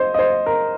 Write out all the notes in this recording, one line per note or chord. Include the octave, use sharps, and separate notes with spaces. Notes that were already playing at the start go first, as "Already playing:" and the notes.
Already playing: C5 D#5
D#5
C5
A#4